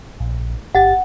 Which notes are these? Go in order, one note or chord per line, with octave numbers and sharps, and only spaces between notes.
A#1
G1 G4 F#5 A6